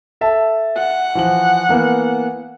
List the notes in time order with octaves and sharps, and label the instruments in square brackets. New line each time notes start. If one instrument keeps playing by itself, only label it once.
[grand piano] A4 E5 A5
[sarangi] F#5
[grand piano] E3 F3 F#7
E3 A#3 B3